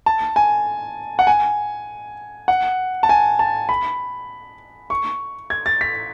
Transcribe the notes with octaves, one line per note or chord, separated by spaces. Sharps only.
A5
G#5
F#5
G#5
F#5
A5
G#5
A5
B5
C#6
G#6
A6
B6